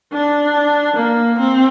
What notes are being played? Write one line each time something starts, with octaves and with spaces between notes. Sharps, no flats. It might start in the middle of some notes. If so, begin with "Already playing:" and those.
D4
A#3
C4